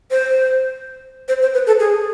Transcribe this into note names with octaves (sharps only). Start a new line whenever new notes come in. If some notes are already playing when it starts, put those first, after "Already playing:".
C5
C5
C5
B4
A4
G#4